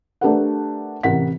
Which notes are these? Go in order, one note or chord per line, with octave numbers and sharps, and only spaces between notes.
A3 D4 G4 A#4 B4 F#5
A1 C3 A#4 F#5 B6